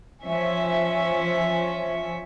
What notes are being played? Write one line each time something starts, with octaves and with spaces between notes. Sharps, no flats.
F3 C#4 E5